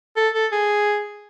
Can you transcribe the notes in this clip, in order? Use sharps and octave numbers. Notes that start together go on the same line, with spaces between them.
A4
A4
G#4